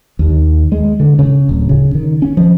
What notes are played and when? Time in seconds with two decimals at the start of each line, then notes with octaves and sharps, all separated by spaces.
0.19 D#2
0.72 G#3
1.00 D3
1.19 C#3
1.49 D1
1.69 C#3
1.95 D#3
2.22 C#4
2.37 F3